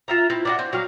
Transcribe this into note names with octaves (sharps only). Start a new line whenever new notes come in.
F4 E5 A#5
C4 E4
D4 E4 F#4
C4
F#3 G3 F5